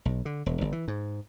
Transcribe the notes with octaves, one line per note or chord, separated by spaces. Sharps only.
B1
D3
E1
G1
E3
G#2